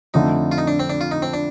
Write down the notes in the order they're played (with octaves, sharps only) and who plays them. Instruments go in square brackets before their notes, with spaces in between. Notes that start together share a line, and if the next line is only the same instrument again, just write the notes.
[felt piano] F2 D3 A3 [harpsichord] D#4
[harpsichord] F4
D#4
D4
C4
D4
F4
D#4
C4
D4